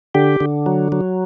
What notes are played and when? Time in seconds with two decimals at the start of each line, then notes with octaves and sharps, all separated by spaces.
0.15 D3 G4
0.40 D3
0.66 F#3
0.92 F#3